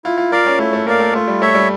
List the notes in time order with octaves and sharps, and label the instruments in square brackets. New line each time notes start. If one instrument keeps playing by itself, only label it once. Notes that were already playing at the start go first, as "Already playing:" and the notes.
[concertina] E4 [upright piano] F4
[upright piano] F4
[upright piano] F4 [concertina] A#4 D5 F5
[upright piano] C#4
[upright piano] A3 [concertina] E4
[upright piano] A3
[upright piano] A#3 [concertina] A#4 D5 F5
[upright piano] A3
[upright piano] A3 [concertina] F4
[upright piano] G3
[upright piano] A3 [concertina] C#5 E5
[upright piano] G3